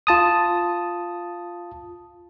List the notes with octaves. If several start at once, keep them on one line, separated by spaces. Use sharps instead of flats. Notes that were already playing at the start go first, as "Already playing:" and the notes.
F4 A5 D#6